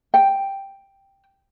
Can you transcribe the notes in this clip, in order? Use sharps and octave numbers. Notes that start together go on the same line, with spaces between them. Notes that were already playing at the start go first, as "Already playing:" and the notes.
G5